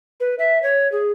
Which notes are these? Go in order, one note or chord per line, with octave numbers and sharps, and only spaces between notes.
B4
E5
C#5
G#4